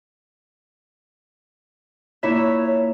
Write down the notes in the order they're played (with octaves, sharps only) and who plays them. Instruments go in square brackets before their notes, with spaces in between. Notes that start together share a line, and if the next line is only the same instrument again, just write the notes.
[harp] A#2 E4 E5 [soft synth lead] C#5